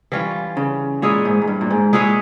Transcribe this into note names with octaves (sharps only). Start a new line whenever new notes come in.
E3 G3 C#4 F4
C#3
A#2 G#3 E4 G#4 C#5
G#2
G#2
G2
A#2
G#2
A#2 G#3 E4 G#4 C#5